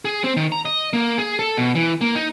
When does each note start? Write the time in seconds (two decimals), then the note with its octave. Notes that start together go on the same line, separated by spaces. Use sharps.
0.05 G#4
0.24 C4
0.37 D#3
0.52 A#5
0.65 D#5
0.93 A#3
1.18 G#4
1.39 A4
1.57 B2
1.75 E3
2.01 A#3
2.15 D#4